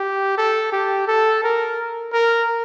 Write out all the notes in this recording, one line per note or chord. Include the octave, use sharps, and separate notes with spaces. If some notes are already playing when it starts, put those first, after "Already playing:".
Already playing: G4
A4
G4
A4
A#4
A#4